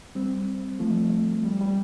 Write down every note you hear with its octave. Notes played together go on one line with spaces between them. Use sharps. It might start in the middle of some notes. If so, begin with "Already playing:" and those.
G3 C4
F3 A3
G3
G3